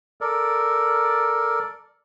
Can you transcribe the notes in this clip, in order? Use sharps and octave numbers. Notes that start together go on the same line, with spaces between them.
A4 A#4 D5